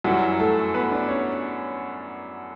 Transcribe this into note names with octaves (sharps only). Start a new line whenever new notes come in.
F#2 E3 F#3 G3 F#4
A3 A4
B3 B4
D4 D5
C#4 C#5